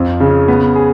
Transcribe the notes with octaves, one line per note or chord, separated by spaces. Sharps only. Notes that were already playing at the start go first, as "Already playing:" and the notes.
Already playing: F2 F3
C#3
B3
G#4